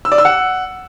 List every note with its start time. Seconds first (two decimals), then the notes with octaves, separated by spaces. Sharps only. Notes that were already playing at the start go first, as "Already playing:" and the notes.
0.05 E6
0.12 D5
0.18 E6
0.25 F#5